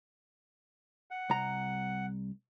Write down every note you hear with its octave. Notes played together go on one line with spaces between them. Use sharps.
F#5
C2 A#5